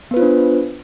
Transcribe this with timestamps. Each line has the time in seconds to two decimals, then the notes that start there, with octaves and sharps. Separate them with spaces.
0.11 B3
0.14 B4
0.17 F4
0.19 C5
0.22 D4